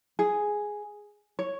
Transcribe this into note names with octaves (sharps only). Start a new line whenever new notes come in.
G#4
C#5